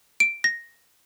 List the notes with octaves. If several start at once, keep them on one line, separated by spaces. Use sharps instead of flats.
D7
A#6